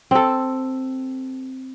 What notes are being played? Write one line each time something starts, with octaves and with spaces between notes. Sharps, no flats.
C4 A4